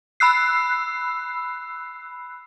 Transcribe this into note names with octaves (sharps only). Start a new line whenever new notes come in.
B5 E6 F#6 C7